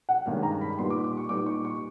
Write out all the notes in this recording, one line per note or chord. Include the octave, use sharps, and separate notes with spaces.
F#5
G2 D#3 G#3 C#4 F5
A#5
B5
A#2 G3 B3 D#4 C6
D6
D6
C#6
A#2 G3 B3 D#4 D6
C#6
C#6